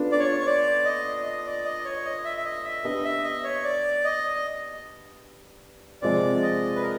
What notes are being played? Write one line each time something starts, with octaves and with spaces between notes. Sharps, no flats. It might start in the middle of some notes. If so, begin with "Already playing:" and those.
Already playing: B3 D4 F4 A4
D5
C#5
C#5
D5
D#5
D#5
D5
D#5
C#5
D#5
E5
E5
D#5
E5
B3 D4 G4 D#5
E5
D#5
C#5
D5
D#5
C3 F3 G#3 C4 D5
D#5
B4
A#4